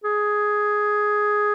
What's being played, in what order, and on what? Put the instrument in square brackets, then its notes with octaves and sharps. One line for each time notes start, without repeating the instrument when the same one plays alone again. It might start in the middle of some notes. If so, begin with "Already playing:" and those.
[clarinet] G#4